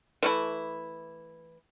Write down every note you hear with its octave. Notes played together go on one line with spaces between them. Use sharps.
E3 A3 E4